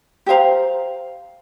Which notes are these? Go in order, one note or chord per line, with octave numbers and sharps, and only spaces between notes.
G4 C5 F5 A#5